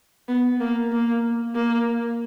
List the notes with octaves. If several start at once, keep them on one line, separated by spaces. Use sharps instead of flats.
B3
A#3
A#3
A#3